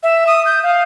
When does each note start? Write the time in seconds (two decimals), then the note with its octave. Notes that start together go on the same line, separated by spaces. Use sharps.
0.03 E5
0.27 D#6
0.46 G6
0.63 F5